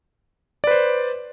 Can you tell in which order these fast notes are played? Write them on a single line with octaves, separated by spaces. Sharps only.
D5 B4 C5